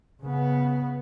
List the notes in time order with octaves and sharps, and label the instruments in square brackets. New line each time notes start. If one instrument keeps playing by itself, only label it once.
[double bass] C#3 B3